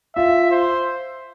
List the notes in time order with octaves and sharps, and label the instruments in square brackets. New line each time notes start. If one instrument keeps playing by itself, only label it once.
[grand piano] F4 [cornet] E5
[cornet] C5